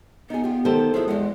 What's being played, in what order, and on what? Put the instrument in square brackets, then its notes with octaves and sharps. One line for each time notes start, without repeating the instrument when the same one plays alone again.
[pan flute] B3 [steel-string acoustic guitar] D#4 G#4
[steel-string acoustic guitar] F4 G4
[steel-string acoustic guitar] D#3 [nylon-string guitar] G4 A4 C5
[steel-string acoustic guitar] F3 F#3 E4 [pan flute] G#4
[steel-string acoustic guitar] E2 F#5 [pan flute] G#3